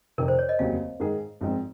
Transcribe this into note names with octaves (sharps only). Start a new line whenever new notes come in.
F2 C3 D#3 A#4
C5
C#5
D#5
F1 D#2 C#3 F#3 F5
G#2 D#3 G#3 D#4 G#4
G#1 G#2 F3 G#3 C4